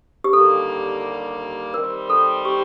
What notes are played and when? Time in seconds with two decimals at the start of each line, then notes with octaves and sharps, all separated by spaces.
0.24 G4
0.33 D#2 D3 G3 A#3 A4
1.74 D#3 G3 C4 A#4
2.10 A4
2.45 G4